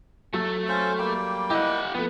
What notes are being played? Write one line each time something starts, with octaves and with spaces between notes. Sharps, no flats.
F#3 A3 A4
C#4 C5 F5
G3 A#3 G5
E4 G4 D#5 F#5 E6
F3 A3 B3